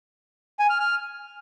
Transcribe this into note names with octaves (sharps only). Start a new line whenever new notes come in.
G#5
F6
F6